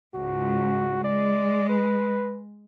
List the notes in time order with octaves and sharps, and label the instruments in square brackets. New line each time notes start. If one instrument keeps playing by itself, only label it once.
[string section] C#2 G#2 [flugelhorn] F#4
[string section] G#3 [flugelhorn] D5
[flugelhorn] B4